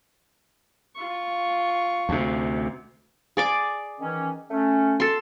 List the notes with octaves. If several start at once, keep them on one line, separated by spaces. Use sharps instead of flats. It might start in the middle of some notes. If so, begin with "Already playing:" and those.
F4 C#6
D2 C3
G#4 D5 D6
D#3 E3 C#4
A3 C#4
A4 C6